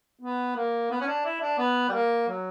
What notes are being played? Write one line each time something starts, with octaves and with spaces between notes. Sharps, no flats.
B3
A#3
B3
C#4
D4
E4
D4
B3
G3
A#3
F#3